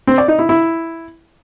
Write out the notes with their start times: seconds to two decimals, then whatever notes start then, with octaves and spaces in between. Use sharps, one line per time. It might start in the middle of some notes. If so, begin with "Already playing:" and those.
0.07 C4
0.18 D5
0.28 D#4
0.39 E4
0.49 E4